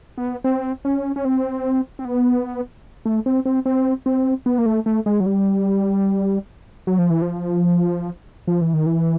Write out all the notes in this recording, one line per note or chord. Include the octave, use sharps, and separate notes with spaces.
B3
C4
C#4
C#4
C4
C4
B3
A3
C4
C4
C4
C4
B3
A#3
A3
A3
G#3
F#3
G3
F#3
F3
E3
F3
F3
E3
D#3
E3